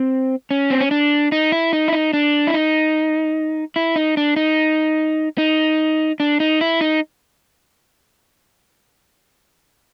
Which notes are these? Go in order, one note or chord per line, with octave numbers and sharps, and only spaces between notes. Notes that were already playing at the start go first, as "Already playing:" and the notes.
Already playing: C4
C#4
C4
C#4
D4
D#4
E4
D#4
E4
D#4
D4
E4
D#4
E4
D#4
D4
D#4
D#4
D4
D#4
E4
D#4